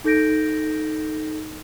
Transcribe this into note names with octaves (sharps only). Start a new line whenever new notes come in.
D#4 A4 G6 A#6 D7